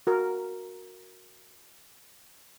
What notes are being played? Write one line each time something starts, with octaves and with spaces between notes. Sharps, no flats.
F#4 A#4